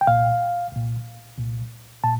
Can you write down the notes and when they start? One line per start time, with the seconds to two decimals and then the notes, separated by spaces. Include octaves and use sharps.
0.01 G5
0.07 C2 A#2 F5
0.72 C2 A#2
1.38 C2 A#2
2.04 A#2 A5